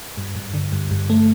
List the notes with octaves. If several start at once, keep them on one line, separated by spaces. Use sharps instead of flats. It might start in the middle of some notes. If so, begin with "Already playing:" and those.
G2
G2
D3
G2
G2
A3